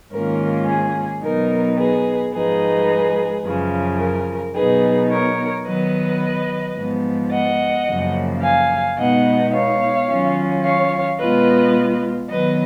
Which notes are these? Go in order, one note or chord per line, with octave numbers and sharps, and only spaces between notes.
G#2 D#3 A#3 C#4 F4 A#4
G#4
B2 F#3 B3 D#4 A#4
G#4 B4
G#2 F3 G#3 D#4 G#4 B4
F#2 C#3 F3
A#4
B2 F#3 B3 D#4 G#4 B4
A#4 C#5
D#3 F#3 B3 B4 D#5
G#2 F3 B3
D#5 F#5
F#2 C#3 F3 A#3
F5 G#5
B2 G#3 B3 D#4 D#5 F#5
C#5 F5
D#3 F#3 C#4 F4
C#5 F5
B2 G#3 B3 F4 B4 D#5
D#3 F#3 B3 B4 D#5